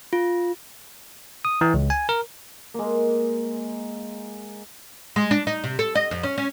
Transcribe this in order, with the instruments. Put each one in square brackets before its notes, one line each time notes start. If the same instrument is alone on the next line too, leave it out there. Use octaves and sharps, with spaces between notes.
[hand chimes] F4
[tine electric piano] D#6
E3
C#2
G#5
A#4
[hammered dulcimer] G#3 A#3
[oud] G#3
D4
D#4
C3
A4
D#5
F2
C#4
C#4